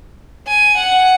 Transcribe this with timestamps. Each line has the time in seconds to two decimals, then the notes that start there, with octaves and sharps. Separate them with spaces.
0.48 G#5
0.78 F#5